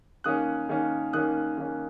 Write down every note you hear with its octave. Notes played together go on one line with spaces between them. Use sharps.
D#3 A#3 C#4 D#6 F#6
D#3 A#3 C#4
D#3 A#3 C#4 D#6 F#6
D#3 A#3 C#4